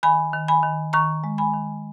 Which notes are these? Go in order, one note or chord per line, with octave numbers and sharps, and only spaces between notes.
D#3 G#5 B5
D#3
G#5 B5
D#3
D#3 A#5 C#6
G#3
G#5 B5
D#3